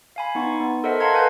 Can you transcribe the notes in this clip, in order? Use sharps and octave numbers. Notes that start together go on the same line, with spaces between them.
F5 G#5 B5
B3 D#4 C#6
B3
A4 A#4 C5 D#5 E5 F#5
F5 F#5 A5 A#5 C6 G#6
A4 B4 F5 F#5 G#5 G6